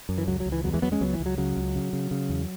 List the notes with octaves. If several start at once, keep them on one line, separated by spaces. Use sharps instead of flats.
F#2
E3
C#2 F#3
F#3
C#2
E3
E2 F#3
E3 G#3
E2 F#3 B3
G#3 C#4
C#2 F#3 B3
E3
C#2
F#3
C#3 F#3
C#2
C#3
C#3
C#3
E2